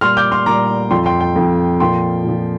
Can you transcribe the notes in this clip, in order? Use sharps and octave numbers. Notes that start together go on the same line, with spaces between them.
A#2 G3 C6 F6
D6 G6
C6 F6
A#2 G3 A#5 D6
F2 F3 G5 C6
G5 C6
G5
F2 F3
A#2 F3 G5 C6
A#2 F3